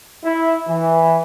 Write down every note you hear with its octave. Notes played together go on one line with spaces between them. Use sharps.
E4
E3